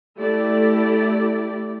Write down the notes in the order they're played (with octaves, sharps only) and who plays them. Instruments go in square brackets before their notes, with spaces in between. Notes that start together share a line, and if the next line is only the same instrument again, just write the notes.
[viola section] A3 E4 G4 D5